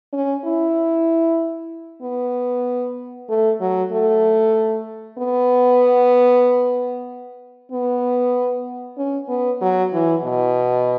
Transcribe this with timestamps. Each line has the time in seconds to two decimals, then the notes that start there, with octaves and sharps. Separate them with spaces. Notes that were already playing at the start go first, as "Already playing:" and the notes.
0.13 C#4
0.44 E4
2.02 B3
3.29 A3
3.61 F#3
3.92 A3
5.18 B3
7.72 B3
8.98 C#4
9.29 B3
9.61 F#3
9.93 E3
10.24 B2